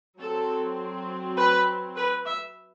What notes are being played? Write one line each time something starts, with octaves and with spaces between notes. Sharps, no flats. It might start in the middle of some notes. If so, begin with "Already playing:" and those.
F#3 C4 A4
B4
B4
E5